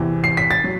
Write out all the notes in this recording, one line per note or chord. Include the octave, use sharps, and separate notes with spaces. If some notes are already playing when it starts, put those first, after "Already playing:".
Already playing: E2 C3 E3
C7
B6
A6
F#3